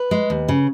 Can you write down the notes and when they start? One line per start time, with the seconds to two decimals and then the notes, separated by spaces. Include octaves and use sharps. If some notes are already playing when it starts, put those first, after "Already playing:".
Already playing: B4
0.11 G#3
0.30 D#2
0.48 C#3